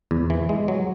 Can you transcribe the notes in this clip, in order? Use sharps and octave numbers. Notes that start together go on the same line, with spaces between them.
E2
E3
G#3
F#3